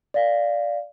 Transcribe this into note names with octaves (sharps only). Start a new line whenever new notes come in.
D5 F5